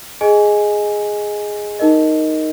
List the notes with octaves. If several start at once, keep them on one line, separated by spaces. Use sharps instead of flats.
G#4 D#5 G#5
D#4 A#4 D#5